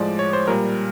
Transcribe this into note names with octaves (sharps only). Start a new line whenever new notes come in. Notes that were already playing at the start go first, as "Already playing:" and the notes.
Already playing: A2 F3 G#3 D5
C#5
C5
A#2 G3 A#4